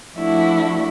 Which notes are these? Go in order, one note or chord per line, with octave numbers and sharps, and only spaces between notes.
F3 A3 D4 E4 F#4